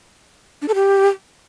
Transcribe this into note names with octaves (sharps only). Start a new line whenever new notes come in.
D4
A4
G4